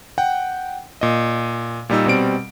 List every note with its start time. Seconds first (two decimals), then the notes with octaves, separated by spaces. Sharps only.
0.18 F#5 G5
1.01 A#2 D#5
1.89 A#2 G3 D#4 E6
2.06 B2 G3 C4 D7